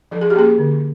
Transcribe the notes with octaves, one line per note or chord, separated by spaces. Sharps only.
F3 A4
G#4
G4
A#3 C#4 G#4
D3